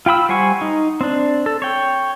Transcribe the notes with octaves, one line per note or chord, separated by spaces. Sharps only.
F4 G5 B5 E6
G3 C5 F#5 G#5 C#6
D#4
C4 D4
A4
C#5 G5